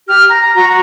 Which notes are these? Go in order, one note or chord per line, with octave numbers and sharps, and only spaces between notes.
G4 F6
A#5
F#4 A#5